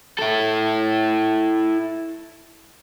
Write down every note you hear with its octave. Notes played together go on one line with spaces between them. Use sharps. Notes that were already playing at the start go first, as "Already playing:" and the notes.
E4 A4